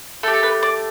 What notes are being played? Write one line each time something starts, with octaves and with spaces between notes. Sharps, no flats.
A3 G4 A4
A4
B4
D5